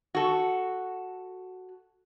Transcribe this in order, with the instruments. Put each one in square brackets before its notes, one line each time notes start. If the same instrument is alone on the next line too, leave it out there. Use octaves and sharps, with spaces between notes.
[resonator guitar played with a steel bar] F#4 A4